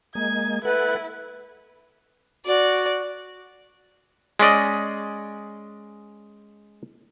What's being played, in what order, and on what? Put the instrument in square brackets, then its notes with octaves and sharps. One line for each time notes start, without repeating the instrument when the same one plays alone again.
[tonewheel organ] G#3 A#3 D#5 [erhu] G#6
[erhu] E4 [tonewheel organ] A4 F#5 [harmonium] B4
[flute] F#4 [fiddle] D5
[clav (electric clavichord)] G#3 C#4 D5 D#5